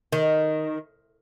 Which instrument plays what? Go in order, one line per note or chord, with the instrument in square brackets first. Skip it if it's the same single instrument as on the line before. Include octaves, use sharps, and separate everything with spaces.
[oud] D#3